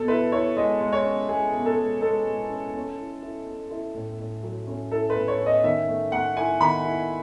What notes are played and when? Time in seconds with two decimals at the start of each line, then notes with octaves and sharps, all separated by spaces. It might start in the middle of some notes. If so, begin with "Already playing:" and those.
Already playing: B2 A4
0.08 E4 B4
0.32 E4 C#5
0.57 G#3 D#5
0.80 G#3
0.93 C#5
1.05 C#4
1.29 G#3 G#4
1.53 B2
1.66 A4
1.78 G#3
2.01 G#3 A4
2.26 G#3
2.50 C#4
2.74 C#4
2.98 E4
3.22 E4
3.47 C#4
3.71 E4
3.94 A2
4.19 A2
4.43 F#3
4.67 C#4
4.91 E4 A4
5.10 B4
5.16 A2
5.28 C#5
5.40 C#4
5.46 D#5
5.64 D#3 E5
5.88 A3
6.12 A3 F#5
6.36 E4 G#5
6.60 D#3 B5
6.85 E4